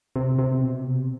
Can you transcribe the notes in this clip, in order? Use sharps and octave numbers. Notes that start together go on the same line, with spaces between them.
C3
C3
B2
C3